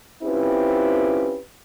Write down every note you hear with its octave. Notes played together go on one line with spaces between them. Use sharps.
C4 C#4 E4 F4 G4 B4